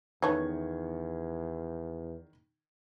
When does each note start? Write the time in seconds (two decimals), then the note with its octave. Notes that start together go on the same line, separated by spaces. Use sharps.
0.22 E2 D#3 A3 B3 C#4 C#6 G#6